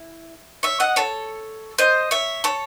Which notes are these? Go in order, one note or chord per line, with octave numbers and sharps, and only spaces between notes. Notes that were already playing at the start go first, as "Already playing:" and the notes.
Already playing: E4
C#5 E5
D#5 F#5
A4 C#5
C5 D#5
C#5 E5
A4 C#5